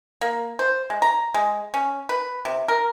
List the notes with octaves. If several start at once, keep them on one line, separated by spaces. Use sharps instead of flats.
A#3
C5
G#3
A#5
G#3
C#4
B4
C3
A#4